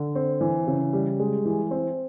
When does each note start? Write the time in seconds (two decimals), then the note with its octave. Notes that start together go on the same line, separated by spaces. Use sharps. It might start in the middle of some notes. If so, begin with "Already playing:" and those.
Already playing: D3
0.15 C4
0.41 E3
0.67 C#3
0.93 G3
1.19 G#3
1.45 E3
1.71 C4